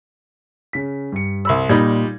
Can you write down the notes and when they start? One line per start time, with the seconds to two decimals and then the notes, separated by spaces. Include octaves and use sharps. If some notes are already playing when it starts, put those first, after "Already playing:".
0.73 C#3 B6
1.12 G2 C#7
1.45 C2 B5 E6
1.69 A#2 G3 D#4 B5 G#6